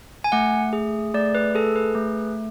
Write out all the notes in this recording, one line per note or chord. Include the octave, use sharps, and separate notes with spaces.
G#5
A3 F#5
G#4
A3 D5
B4
G#4 A4
B4
A3